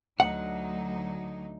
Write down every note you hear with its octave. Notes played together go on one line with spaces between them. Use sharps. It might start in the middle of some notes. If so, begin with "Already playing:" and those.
D2 F#3 D#4 F#5